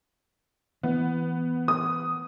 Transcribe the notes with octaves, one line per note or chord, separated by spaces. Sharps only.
E3 B3
D#6